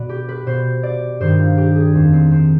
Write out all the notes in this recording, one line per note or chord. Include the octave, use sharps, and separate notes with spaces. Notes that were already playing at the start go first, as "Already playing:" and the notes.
Already playing: B2 B4 D5
G4
B4
B2 C5
D5
G2 D#3 C5
F4
G4
G#4
F2 D#3 C4
C4
C4